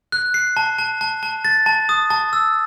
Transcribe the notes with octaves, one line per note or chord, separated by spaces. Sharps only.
F#6
C7
A5
A5
A5
A5
A6
A5
D#6
A5
E6